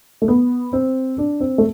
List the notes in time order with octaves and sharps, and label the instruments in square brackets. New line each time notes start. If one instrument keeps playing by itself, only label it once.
[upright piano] A3
B3
C4
D4
C4
A3